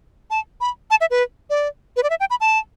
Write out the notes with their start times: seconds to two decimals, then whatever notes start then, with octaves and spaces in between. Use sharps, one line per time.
0.30 A5
0.61 B5
0.91 A5
1.01 E5
1.11 B4
1.50 D5
1.96 B4
2.03 D5
2.10 E5
2.20 G5
2.30 B5
2.41 A5